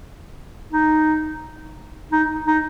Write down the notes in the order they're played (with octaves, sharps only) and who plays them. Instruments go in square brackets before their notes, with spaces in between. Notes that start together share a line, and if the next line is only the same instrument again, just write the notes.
[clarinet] D#4
D#4
D#4